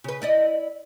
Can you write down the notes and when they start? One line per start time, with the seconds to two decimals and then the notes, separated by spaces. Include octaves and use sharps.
0.04 C#3 B4
0.22 E4 D5 D#5